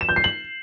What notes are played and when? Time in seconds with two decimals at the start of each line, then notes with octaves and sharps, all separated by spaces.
0.01 E7
0.09 G6
0.16 C7
0.24 F#7